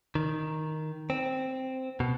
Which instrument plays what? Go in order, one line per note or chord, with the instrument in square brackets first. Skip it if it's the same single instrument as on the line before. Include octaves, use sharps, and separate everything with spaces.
[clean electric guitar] D#3
C4
B2